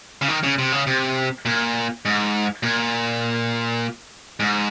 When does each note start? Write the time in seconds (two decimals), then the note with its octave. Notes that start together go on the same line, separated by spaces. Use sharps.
0.22 C#3
0.28 D#3
0.43 C#3
0.59 C3
0.72 C#3
0.87 C3
1.45 A#2
2.05 G#2
2.63 A#2
4.40 G#2